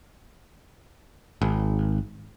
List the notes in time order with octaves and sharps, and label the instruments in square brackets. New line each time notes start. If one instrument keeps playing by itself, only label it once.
[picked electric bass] G#1